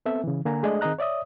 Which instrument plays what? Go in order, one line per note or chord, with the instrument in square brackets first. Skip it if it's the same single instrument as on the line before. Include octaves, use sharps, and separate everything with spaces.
[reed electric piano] B3 C4 A4 E5
C#3 E3
D3 A#3 G#5 A#5
G#3 A3 D4 G#4 D5 D#5
D#3 C4 G#4 D#5 A#5 F#6
C#5 D5 E5 D#6